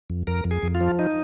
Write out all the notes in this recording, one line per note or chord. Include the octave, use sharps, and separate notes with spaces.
F2
F2 A#4
F2
G#4
F2
F4
F3
D#4